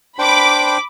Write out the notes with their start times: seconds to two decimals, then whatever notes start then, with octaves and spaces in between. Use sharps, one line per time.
0.19 D4 C5 G5 B5 D6